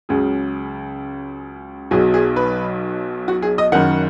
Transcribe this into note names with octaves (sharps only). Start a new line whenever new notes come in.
C#2 C#3 F#3 G#4
B1 B2 F#3 G#4
G#4
B4
F#4
G#4
D#5
F#1 F#2 D#3 F#5